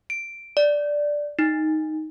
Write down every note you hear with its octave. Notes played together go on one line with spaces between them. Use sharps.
D7
D5
D#4